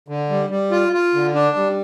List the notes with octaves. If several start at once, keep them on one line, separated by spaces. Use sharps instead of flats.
D3
G3
G3
F4
F4
D3
D4
G3